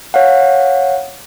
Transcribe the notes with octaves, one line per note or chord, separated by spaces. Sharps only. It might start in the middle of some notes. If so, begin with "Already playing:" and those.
C#5 F5 F#5